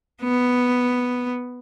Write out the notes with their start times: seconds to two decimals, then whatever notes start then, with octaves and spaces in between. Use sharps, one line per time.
0.23 B3